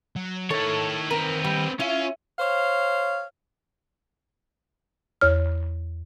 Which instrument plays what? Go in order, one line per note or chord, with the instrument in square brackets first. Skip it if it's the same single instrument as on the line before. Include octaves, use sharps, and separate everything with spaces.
[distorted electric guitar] F#3
[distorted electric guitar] D#3 [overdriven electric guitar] E4 C#5 [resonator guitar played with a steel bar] A4
[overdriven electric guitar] C4 B4 [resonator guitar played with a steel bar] A#4
[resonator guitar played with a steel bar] G3
[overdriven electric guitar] C#4 [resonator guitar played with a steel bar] E4 [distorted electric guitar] F4
[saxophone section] C5 C#5 F5
[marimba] E2 C#5 F6